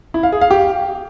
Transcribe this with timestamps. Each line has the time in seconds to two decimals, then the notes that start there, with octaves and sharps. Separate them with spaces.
0.14 E4
0.23 F5
0.32 G#4
0.41 F5
0.51 G4